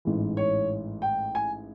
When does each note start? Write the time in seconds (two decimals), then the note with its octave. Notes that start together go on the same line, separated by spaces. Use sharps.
0.05 A1 G#2 E3
0.37 C#5
1.02 G5
1.35 G#5